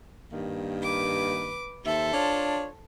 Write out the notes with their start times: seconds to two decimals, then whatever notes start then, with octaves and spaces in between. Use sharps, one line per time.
0.33 G2 D#3 A#3
0.83 B4 D6
1.86 D#2 A4 C5 E5
2.14 D4 F4 C#5